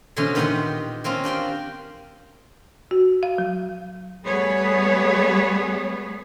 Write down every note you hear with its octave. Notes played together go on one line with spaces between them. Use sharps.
B2 D3 E3 C#4 C5 C6
A#2 D#3 B3 G4 F#5 C6
A#3 C4 C#4 F4
D4 G4 G5 C6
F#4
F5
F#3
G3 A3 B3 G#4 B4 C#5